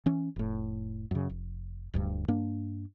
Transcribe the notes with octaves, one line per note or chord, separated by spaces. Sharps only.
E3 C#4
F1 A2
F#2 C#3
F1
D1 D2 G2
G2 A#3 D4